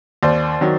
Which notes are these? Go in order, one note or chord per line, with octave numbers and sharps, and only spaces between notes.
D#2 C5 D5
D#3 F#3